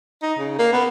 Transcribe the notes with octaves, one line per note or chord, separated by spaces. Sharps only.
D#4
C#3
A#3
B3